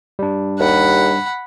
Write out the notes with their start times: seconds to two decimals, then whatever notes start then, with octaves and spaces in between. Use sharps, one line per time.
0.19 G3 D4
0.59 D#2 F#5 B5